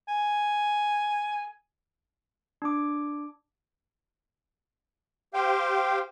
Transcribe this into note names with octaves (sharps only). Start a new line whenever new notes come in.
G#5
D4 D6
G4 C5 F5 G5